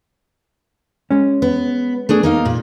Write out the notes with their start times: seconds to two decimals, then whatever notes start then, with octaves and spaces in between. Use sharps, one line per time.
1.11 G#3 C#4
1.42 B3
2.09 A3 D4 G#4
2.23 A#3 D#4 F5
2.45 A#2